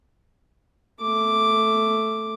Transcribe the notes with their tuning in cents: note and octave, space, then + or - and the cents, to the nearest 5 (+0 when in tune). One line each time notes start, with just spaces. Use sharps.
A3 +0 D6 +0